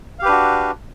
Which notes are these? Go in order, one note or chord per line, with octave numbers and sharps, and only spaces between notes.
D4 F#4 G4 B4 F5